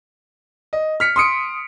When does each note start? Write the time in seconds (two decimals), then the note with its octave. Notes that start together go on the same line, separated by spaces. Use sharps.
0.73 D#5
1.00 F6 B6 C#7
1.16 C6 D#6 C#7 D7